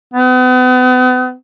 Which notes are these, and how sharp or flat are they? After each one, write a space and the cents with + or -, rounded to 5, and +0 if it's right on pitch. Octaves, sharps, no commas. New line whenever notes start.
B3 +40